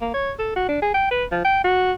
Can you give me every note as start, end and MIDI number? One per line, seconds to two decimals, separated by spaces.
0.02 0.10 58
0.14 0.32 73
0.39 0.55 69
0.56 0.69 66
0.69 0.81 62
0.82 0.89 68
0.94 1.09 79
1.11 1.25 71
1.31 1.41 53
1.44 1.63 79
1.64 1.93 66